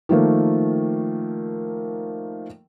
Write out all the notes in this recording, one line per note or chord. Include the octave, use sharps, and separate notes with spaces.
D#3 F3 A3 A#3